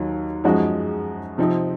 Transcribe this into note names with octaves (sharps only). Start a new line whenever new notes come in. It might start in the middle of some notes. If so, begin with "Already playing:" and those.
Already playing: D#2 D#3 F#3
F#2 F3 G#3 D#4 F#4
C3 F3 C4 D#4